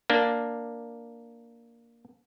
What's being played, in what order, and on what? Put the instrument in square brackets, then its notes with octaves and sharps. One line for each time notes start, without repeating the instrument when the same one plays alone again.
[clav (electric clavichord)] A#3 D4